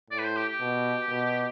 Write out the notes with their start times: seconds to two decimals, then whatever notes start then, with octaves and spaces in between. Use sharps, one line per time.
0.10 A2 D5
0.18 B4
0.23 C5
0.36 G4
0.48 G4
0.60 B2
1.10 B2